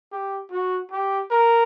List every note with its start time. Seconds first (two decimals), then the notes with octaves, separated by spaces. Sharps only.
0.12 G4
0.51 F#4
0.91 G4
1.31 A#4